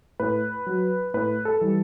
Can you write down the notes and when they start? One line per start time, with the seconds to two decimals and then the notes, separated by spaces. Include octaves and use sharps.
0.20 A2 B4
0.66 F#3
1.14 A2 B4
1.45 A4
1.61 E3 G3